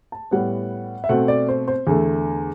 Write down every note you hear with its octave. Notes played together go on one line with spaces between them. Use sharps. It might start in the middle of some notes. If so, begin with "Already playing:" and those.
A5
A2 G3 B3 F#5
E5
B2 A3 C4 F#5
D5
C5
C5
E2 D3 A3